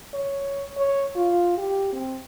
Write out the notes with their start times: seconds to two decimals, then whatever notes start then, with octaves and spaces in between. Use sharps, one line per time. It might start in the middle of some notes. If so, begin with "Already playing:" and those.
0.14 C#5
0.77 C#5
1.15 F4
1.57 G4
1.93 C4